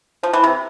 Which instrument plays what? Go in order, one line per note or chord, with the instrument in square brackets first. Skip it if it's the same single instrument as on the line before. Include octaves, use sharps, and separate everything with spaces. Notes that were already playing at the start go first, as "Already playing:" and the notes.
[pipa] F3 [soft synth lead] C5
[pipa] E3
C3